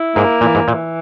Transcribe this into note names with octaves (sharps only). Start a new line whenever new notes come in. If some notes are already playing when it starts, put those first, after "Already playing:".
Already playing: E4
G#2 A#3
A#2 E3
G#2
A#2 E3